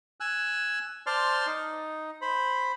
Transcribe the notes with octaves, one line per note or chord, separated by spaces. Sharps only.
G#5 E6 F#6
C5 D5 A5 C6 F6
D#4
C5 B5